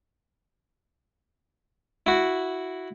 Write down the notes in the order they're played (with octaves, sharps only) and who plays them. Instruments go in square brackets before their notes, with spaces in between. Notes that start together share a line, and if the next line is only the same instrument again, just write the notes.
[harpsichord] E4 F#4